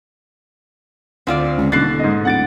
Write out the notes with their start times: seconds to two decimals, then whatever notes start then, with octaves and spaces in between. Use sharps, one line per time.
1.27 D2 C4 F4 D5
1.58 C#2
1.72 D#1 B2 D3 F#6 A6 C7
1.99 G#2 D#5
2.25 D1 F#5 A6 D7